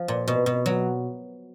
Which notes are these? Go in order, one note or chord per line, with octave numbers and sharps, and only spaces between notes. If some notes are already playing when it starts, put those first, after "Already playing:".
Already playing: F3
A#2
B2
B2
F#3